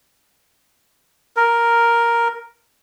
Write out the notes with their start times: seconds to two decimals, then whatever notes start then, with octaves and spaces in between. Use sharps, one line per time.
1.37 A#4